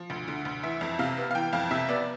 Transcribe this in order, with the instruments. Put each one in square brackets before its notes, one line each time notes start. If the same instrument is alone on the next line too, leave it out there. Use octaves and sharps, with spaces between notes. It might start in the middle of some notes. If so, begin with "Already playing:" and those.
Already playing: [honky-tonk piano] F3
D2
D3
D2
E3 E5
F2
C3 F5
B3
F5
E3 G5
F2 F5
C3 E5
B3 D5